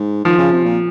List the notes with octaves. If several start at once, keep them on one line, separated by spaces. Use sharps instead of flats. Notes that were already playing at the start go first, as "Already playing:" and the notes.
Already playing: G#2
D#3 F3
C#3
C3
A#2